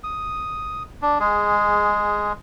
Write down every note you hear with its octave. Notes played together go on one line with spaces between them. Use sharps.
D#6
D4
G#3 G#4